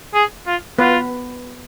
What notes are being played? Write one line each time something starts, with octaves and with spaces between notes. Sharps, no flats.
G#4
F4
B3 F4 B4